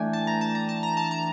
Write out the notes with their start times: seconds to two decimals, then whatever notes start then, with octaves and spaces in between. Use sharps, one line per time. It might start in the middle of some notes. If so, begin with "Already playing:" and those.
Already playing: E3 A3 D4 G5 G#5
0.13 A5
0.27 A#5
0.41 A5
0.55 A#5
0.69 A5
0.83 A#5
0.97 A5
1.11 A#5